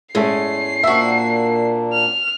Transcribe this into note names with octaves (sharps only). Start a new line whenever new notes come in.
E2 G#2 G#3 A3 C#4 C7
A#2 A#3 C4 D4 F#4 E5 C#6
F6